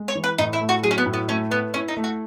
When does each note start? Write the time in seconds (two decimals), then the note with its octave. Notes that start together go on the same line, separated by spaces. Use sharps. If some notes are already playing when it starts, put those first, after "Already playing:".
Already playing: G#3
0.08 C#5
0.15 E3
0.24 B4
0.38 A2 D#4
0.53 E4
0.60 A3
0.69 F#4
0.83 F#3 G#4
0.91 C#4
0.98 B3
1.06 A2
1.13 B3
1.28 A3 C#4
1.51 B3 B4
1.74 C#4 E4
1.88 D#4
1.97 A3
2.04 F#4